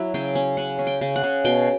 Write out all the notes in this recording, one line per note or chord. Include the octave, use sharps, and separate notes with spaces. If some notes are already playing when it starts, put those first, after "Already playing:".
Already playing: F#3 E4
C#3 G5
C#4
C#3 F#5
C#4
G5
C#3
F#5
C#3
B2 G5